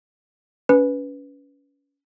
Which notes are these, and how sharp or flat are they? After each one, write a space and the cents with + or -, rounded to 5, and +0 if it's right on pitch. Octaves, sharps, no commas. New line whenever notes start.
C#4 +30 B4 +0